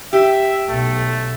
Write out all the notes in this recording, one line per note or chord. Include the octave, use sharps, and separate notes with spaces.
G4 E5
B1 A3